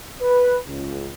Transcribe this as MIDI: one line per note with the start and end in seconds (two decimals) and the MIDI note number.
0.22 0.57 71
0.67 1.11 37